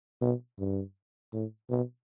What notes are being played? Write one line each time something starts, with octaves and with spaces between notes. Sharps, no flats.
B2
G2
A2
B2